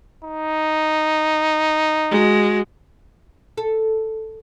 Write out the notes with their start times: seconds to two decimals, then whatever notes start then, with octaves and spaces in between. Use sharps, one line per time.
0.25 D#4
2.10 G#3 F#4
3.58 A4